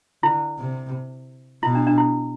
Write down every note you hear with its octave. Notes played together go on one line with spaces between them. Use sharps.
D3 E4
C3
B2 E4
D4
D4
E4